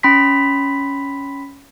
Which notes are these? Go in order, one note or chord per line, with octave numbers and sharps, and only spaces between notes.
C#4 B5 C6 B6